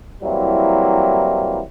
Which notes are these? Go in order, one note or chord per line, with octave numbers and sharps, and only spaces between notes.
E3 F#3 G3 A#3 C4 E4